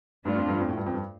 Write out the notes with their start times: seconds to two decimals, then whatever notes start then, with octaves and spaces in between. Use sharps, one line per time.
0.24 G2 F3 A3 D4 F4
0.36 F2
0.48 G2
0.60 F2
0.69 A2
0.77 G2
0.86 F2
0.94 G2